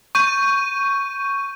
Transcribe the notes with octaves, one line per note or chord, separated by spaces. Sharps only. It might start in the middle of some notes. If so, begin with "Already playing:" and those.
C#6 G6 D#7